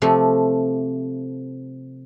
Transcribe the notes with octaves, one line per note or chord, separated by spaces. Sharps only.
C3 F3 A3